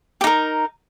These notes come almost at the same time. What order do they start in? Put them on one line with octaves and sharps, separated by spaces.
G4 D#4 A#4